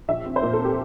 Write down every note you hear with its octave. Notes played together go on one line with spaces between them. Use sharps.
A#1 E5
C4
C5
A#2 A#4
A4
C4
G4